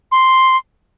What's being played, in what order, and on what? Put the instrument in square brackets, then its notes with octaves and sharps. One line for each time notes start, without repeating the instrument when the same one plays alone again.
[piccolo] C6